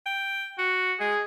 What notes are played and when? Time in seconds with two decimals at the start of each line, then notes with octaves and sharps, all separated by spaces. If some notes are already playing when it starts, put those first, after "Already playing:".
0.06 G5
0.58 F#4 F#5
1.00 G#3 G#4